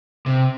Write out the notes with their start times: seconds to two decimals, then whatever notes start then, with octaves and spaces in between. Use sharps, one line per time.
0.26 C3